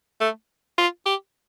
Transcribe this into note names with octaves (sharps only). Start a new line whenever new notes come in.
A3
F4
G4